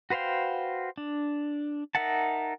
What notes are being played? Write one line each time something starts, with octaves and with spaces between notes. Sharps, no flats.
F#4 B4 C5 F5 G5
D4
D#4 A#4 E5 F#5 A5